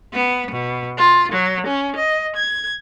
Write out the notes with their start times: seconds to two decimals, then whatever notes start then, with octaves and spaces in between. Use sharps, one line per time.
0.13 B3
0.50 B2
0.97 F4
1.32 F#3
1.66 C#4
1.96 D#5
2.35 G#6